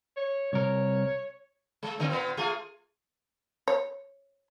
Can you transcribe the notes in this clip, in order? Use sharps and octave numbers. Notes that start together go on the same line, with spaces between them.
C#5
C2 A#4 C#5
G#3
A#2 D3 C4
A#2 B3
A3 F4 G#4
C#5